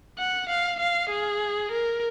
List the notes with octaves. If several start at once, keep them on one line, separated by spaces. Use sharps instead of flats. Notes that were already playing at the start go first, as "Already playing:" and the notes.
F#5
F5
F5
G#4
A#4